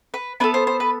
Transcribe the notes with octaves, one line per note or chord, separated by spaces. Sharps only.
B4
B3 D4 A4 B4
C5
C5
B4